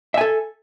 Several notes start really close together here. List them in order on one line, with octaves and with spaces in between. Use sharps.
E5 G#5 A4